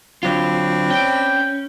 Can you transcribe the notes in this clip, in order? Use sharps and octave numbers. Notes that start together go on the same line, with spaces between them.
D3 F#3 C4 D4 F4 B5
C#4 G5